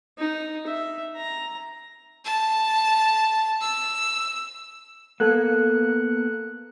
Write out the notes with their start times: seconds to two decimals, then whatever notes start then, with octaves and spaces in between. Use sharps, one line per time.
0.18 D#4
0.67 E5
1.17 A#5
2.25 A5
3.61 E6
5.20 A#3 B3 A4 F#6